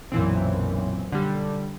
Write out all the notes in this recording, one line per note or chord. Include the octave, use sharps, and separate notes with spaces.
B1 F#2 A#2 E3 C4
D3 G3